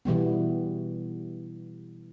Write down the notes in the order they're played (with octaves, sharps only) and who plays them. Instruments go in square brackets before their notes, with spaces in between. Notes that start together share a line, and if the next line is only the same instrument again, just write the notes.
[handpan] B2 E3 G3 B3